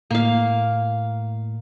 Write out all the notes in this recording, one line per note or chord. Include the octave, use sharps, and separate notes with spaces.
A2 A#3 F5